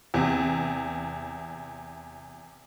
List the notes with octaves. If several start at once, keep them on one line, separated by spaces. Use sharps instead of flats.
E2 C3